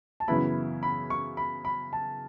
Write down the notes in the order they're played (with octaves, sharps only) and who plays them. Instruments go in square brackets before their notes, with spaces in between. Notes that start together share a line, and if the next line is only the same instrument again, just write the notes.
[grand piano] A5
[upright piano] F#2 C#3 E3 B3 E4 [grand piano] B5
[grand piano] B5
C#6
B5
B5
A5